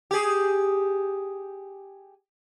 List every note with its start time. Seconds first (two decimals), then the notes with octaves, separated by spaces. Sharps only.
0.11 G4 G#4